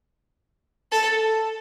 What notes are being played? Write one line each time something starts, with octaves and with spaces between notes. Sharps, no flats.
A4